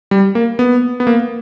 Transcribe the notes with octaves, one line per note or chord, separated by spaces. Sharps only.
G3
A#3
B3
B3
A#3